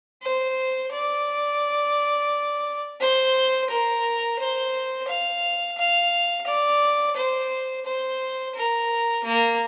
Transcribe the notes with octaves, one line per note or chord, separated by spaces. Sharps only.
C5
D5
C5
A#4
C5
F5
F5
D5
C5
C5
A#4
A#3